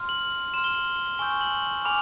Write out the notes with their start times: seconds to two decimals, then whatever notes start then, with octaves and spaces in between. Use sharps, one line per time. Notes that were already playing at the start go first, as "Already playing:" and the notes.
Already playing: C6 F6
0.09 F#7
0.54 C6 F6 E7
0.64 G7
0.75 F#7
0.97 G7
1.19 G#5 C#6 E6 G6 G7
1.41 F#7
1.62 F#7
1.85 G#5 B5 D6 F6 F7